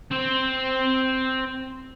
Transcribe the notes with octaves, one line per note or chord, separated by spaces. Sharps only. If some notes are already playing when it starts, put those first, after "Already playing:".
C4 C5